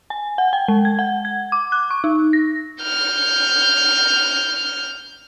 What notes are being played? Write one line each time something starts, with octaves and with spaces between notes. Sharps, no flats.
G#5
F#5
G5
G#3
G#6
F#5
G#6
D6
F#6
C#6
D#4
A#6
F6 G6